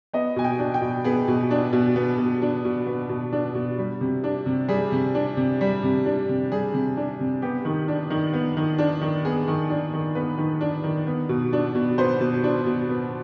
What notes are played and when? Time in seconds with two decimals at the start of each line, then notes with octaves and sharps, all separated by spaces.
0.13 B3 D#5
0.36 B2 G#5
0.44 G5
0.59 D4
0.74 G5
0.82 B2
1.04 B3 G#4
1.28 B2
1.51 D4
1.73 B2
1.96 B3
2.18 B2
2.42 D4
2.65 B2
2.87 B3
3.09 B2
3.32 D4
3.55 B2
3.78 G3
4.01 C3
4.24 D4
4.46 C3
4.68 G3 G#4
4.92 C3
5.15 D4
5.37 C3
5.61 G3
5.83 C3
6.06 D4
6.29 C3
6.52 G3 G#4
6.74 C3
6.97 D4
7.20 C3
7.42 B3 G4
7.65 D#3
7.88 D4
8.10 D#3
8.34 B3
8.57 D#3
8.78 D4
9.01 D#3
9.25 B3 G#4
9.48 D#3
9.70 D4
9.93 D#3
10.15 B3 B4
10.38 D#3
10.61 D4
10.84 D#3
11.07 B3
11.29 B2
11.53 D4
11.75 B2
11.98 B3 C5
12.21 B2
12.44 D4
12.66 B2
12.89 B3